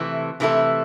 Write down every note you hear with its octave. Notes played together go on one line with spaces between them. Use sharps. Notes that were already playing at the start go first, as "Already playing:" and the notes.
Already playing: C3 E3 A3 A4
C3 E3 A3 E4 A4